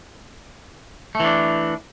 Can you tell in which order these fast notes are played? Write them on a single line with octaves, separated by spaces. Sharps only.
A3 E3 D4